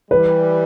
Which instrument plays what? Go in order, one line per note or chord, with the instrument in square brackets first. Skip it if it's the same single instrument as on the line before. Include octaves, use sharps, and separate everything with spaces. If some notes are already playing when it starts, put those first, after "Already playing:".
[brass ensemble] E3 G3 [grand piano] B4